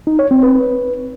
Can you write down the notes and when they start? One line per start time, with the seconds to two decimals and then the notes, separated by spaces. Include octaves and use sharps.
0.07 D#4
0.19 C#5
0.31 C4
0.43 B4